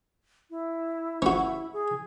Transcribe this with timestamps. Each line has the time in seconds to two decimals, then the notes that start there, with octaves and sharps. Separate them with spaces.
0.50 E4
1.22 C#4 F#4
1.73 G#4